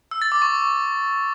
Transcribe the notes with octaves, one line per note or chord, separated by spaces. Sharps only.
E6
A6
D6
C#6